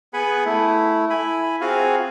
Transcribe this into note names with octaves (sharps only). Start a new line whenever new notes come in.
B3 G#4 B4 F#5 G#5 B5
A3 E4
E4 G#5 B5
C4 F4 F#4 G#4 F5 G#5